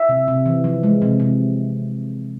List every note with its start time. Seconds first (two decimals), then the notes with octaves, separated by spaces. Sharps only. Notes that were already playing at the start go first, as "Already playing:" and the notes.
Already playing: E5
0.09 C3
0.28 C3
0.46 E3
0.64 F3
0.83 G#3
1.02 C3
1.20 C3